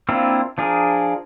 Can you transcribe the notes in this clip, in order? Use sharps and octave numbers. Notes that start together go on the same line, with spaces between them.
A#3 C4 D4 E4 F4
F3 D4 G#4 A#4